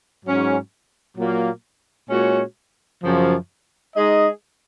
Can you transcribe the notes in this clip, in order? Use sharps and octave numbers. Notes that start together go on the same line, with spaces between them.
G#2 F#3 C#4
A#2 F#3 A#3
A#2 G#3 C#4 F#4 C#5
F#2 C#3 F3
G#3 D#4 G#4 D#5